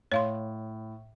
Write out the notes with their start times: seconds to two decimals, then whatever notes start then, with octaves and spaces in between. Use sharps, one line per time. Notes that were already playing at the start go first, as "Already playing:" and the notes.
0.12 A2 C#5 F5 C6